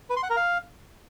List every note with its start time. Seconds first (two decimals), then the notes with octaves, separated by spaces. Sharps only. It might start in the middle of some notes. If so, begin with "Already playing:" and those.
0.10 B4
0.16 C6
0.23 F#5
0.30 A#4
0.36 F5